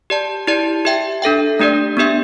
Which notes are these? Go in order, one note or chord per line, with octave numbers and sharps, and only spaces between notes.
G4 D5 A5
E4 G4 D5 A5
G4 E5 G5
D4 A4 E5 G5
A3 D4 G4 D5
B3 D4 G4 E5